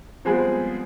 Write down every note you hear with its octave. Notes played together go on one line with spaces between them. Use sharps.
F3 G3 G#3 B3 C4 G#4